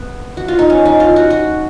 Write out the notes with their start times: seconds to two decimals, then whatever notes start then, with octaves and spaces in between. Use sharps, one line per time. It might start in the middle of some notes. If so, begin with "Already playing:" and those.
Already playing: B3
0.37 F#4
0.48 F4
0.59 D#4
0.70 C#4
0.85 D#4
1.00 F4
1.16 F#4
1.30 F#4